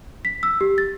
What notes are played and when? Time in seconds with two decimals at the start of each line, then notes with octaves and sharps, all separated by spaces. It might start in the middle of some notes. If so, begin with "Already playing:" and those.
0.25 B6
0.43 E6
0.61 G4
0.78 A6